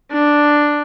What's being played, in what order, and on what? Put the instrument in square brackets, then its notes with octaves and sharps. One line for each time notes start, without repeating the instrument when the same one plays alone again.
[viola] D4